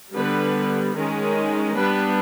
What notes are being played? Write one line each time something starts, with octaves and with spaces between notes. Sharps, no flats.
D3 G3 B3 B4
D#3 G#3 C#4
G3 B3 D4 B4